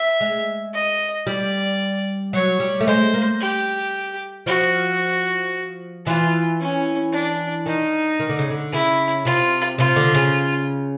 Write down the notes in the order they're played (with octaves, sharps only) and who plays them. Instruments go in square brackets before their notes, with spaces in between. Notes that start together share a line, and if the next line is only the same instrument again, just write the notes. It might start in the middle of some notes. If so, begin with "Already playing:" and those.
Already playing: [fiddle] E5
[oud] G#3
[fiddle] D#5
[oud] G3 [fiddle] D5
[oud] F#3 [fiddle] C#5
[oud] G3
A3
[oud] G#3 [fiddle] C5
[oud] A#3
[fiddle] G4
[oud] F3 [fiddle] F#4
[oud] E3 [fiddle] F4
[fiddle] C#4
D4
[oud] D#3 [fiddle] D#4
[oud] D#3
D3
C#3
D3
[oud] C#3 [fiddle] E4
[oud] C3 [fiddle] F4
[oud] C3 [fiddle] F4
[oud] D3
C#3